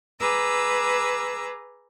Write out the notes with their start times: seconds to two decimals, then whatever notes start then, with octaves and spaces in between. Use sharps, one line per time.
0.19 G#4 B4 A#5 D6 E6